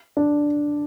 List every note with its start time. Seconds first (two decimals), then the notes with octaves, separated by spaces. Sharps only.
0.17 D4